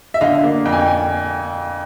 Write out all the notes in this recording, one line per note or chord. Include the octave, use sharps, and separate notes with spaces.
E5
D3 D#5 F5
A#3
F2 G5
G#5
G5
G#5